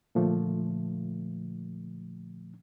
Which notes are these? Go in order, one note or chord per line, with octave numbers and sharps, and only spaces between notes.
A#2 D3 F3 A3